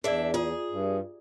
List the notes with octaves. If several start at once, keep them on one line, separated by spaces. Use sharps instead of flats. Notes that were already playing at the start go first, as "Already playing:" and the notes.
E2 D4 G#4 D5 E5
F4 G#4
G2